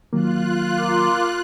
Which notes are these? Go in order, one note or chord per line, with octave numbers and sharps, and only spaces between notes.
D#3 F#3 A#3 F4 F#6
A#4 C6 D6